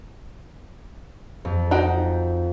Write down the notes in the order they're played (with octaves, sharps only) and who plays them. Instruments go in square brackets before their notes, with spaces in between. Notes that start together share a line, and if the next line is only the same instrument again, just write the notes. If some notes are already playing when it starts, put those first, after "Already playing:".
[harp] F2
[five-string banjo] D#4 F#4 G5